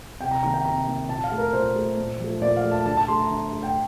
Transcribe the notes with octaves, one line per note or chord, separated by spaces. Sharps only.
C3 G5
A#5
D#3 A#3 A#5
G5
C3 A#5
D#3 A#3
A#2 A5
F5
A3
A#4
A#2 C5
A3
A#2
F3 A3
A#2 D5
F5
F3 A3
A5
D3 A5
A5
A3 C6
A#5
D3
A3
G5